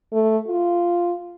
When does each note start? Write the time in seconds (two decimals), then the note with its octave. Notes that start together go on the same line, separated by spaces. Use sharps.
0.12 A3
0.47 F4